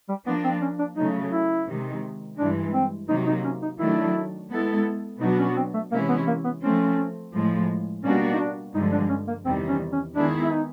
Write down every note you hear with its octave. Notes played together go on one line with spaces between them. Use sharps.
G3
F3 A#3 B3 D4
C4
C#4
D4
C#3 F#3 A3 D#4
E4
C3 D#3 G#3
G2 E3 G#3 D4
C4
C3 D#3 F#3 A#3 D#4
D#4
C#4
D#4
D#3 F#3 A3 D4 E4
G#3 B3 E4 A4
B2 F#3 B3 D4 D#4 F#4
C#4
C4
A3
C3 E3 G#3 A#3 C#4 E4
B3
A#3
B3
F3 A3 C4 C#4
A2 F3 G#3
B2 G3 A#3 C#4 D4 F#4
D#4
D4
G2 D3 F3 G#3 D#4
D4
C#4
A#3
E2 C3 D#3 G3 C4
C#4
C#4
D#3 G#3 B3 D4 E4 G#4
E4
D#4